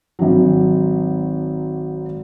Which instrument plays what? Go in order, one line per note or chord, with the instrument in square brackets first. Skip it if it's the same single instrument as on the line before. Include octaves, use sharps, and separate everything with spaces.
[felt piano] G#1 F#3